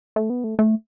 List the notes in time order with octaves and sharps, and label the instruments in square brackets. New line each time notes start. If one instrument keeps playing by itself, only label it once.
[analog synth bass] A3
B3
A3
A3